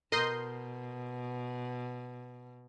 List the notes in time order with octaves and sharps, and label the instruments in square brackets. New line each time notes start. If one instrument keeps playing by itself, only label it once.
[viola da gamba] B2 [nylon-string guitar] A#4 [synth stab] D#5 C6 G6